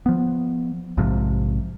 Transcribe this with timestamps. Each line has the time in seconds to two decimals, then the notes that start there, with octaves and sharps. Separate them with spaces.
0.06 F3 B3
0.97 A#1 G#2 C3 F3